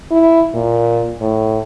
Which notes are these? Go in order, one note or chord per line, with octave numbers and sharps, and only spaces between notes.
E4
A#2
A2